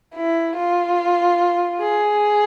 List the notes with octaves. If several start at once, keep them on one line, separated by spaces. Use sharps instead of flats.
E4
F4
G#4